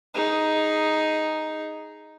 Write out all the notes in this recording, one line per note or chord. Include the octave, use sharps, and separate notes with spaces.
D#4 G#4